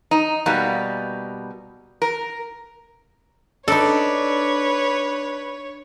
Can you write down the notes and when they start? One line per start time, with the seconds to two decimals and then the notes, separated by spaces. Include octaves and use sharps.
0.11 D#4
0.46 B2 G3 A#3 D#4
2.02 A#4
3.68 D4 D#4 A4 B4 C#5